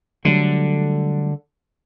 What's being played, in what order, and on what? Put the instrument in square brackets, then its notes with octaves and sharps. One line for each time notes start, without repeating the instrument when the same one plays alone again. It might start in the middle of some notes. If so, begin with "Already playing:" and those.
[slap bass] D3 [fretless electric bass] F#3 G3 A3